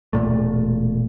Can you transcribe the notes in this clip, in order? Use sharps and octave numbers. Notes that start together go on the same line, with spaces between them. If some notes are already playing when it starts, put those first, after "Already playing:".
E1 F2 A#2 A3